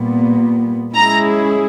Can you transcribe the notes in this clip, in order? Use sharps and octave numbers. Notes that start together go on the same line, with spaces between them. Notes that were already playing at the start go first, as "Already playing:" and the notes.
Already playing: A#2 G3 B3
G#3 C#4 E4 G#4 A#5